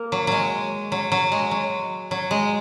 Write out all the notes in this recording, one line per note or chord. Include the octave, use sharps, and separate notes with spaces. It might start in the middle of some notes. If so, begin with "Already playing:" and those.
Already playing: A#3
F#3
F#3 G#3
F#3
F#3
G#3
F#3
F#3
G#3